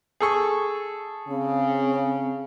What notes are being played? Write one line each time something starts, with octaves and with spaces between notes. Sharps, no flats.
G#4 A4 C#6
C#3 C4